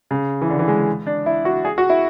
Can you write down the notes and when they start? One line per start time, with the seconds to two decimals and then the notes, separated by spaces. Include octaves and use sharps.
0.11 C#3
0.42 E3
0.50 D3
0.59 E3
0.68 G#3
1.07 D4
1.26 E4
1.45 F#4
1.65 G#4
1.78 F#4
1.90 E4